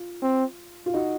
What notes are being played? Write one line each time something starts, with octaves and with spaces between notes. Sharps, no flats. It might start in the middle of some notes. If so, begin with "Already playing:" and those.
Already playing: F4
C4
F4
D#4 F#4